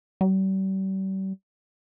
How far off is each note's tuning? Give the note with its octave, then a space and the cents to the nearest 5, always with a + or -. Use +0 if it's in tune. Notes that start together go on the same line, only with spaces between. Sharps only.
G3 -40